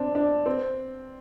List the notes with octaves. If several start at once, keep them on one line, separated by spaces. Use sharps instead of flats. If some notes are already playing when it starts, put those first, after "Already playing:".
Already playing: C4 D4
D4
C4